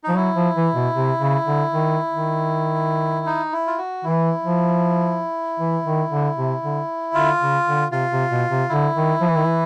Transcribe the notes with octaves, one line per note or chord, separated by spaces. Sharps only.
F3 D#4
F#3 E4
F3
E3
B2
C3
C#3
D3
D#3
D#3
D#4
E4
F4
F#4
E3 E4
F3
E3
D#3
D3
C3
D3
D3 F4
C#3
D3
C3 F4
C3
B2
C3
D3 E4
D#3
F3
E3
D#3
E3